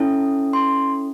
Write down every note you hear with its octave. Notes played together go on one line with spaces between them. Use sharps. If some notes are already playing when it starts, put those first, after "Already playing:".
Already playing: C#4 E4 A4
C6